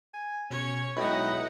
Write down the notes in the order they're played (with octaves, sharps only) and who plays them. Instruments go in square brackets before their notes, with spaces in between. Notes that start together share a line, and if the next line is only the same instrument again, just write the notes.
[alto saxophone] G#5
[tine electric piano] B2 [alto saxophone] C#4 [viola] C#5
[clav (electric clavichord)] B1 [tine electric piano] G#3 G5 B5 [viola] D#4 F#5 [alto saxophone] E4